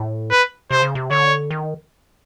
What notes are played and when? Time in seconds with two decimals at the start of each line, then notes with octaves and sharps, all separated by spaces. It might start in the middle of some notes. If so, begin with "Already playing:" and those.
Already playing: A2
0.30 B4
0.71 C3 C5
0.82 C#3
0.95 C3
1.10 D3 C#5
1.51 D#3